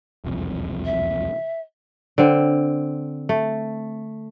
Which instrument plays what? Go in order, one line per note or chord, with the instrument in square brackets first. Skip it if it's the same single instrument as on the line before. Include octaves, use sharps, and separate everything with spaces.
[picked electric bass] E1 C2 F2
[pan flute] E5
[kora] D3 C4
A3